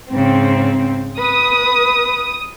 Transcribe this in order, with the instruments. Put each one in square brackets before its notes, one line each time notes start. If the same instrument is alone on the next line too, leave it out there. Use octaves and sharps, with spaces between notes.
[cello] G#2 C#3 [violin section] C4
[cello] B4 [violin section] D#6